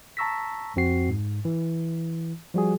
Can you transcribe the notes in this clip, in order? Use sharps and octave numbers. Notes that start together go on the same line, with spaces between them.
A5 A#5 C#6 E6 A#6 B6
F2 C4 F#4 C7
G#2
E3
F3 G3 F#4 G#4